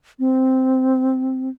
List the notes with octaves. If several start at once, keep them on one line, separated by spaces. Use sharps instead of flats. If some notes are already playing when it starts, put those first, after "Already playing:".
C4